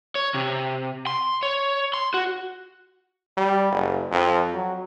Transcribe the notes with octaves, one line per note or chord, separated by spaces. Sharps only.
C#5
C3
C6
C#5
C6
F#4
G3
F#1
F2
F#3